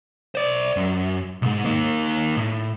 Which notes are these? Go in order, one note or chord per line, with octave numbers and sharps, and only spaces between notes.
C5 D5
F#2
B1 G#2
A#3 D#4
A2